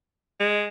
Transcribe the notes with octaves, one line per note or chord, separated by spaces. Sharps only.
G#3